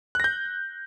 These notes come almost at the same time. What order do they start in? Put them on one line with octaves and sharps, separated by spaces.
F#6 A#6 G6